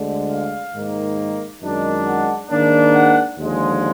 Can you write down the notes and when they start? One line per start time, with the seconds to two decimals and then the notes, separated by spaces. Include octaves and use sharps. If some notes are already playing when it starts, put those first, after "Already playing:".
Already playing: D2 D3 G#3
0.30 F5
0.74 G#2 D#3 A#3
1.62 F#2 D#3 G#3 D4
2.07 F#5
2.50 G#2 D#3 A#3 D4
2.94 F#5
3.39 D#2 D3 F3 G#3